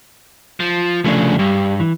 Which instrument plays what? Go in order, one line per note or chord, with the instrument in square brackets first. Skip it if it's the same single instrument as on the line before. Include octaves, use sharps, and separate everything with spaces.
[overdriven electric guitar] F3
[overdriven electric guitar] C2 C#3 [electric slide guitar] F3 A3 D4
[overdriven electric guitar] G2 [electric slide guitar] G3
[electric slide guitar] E3